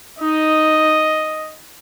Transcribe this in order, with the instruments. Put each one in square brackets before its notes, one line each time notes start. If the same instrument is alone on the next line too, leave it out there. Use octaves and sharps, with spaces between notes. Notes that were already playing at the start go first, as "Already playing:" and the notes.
[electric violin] D#4 [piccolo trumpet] D#5